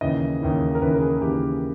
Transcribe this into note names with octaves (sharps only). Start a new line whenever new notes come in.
D#2 C#3 E3 D#5
D#2 C#3 E3
A#4
D#2 C#3 E3 B4
A#4
G#4
D#2 C#3 E3 G4